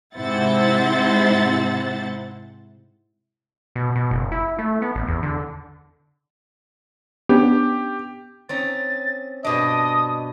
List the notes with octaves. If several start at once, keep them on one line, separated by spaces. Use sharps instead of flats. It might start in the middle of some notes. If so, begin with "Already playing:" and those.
G#2 C3 E4 C5 F#5 A6
B2
B2
F#1
E4
A3
B3
A1
E2
D3
B3 C#4 D4 G4
C4 C#4 D#4 A6
G2 B2 D4 D#5 D#6